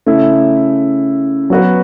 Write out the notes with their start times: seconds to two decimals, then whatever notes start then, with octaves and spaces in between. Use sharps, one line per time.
0.06 C#3 A3 E4
1.50 F#3 B3 F#4 B4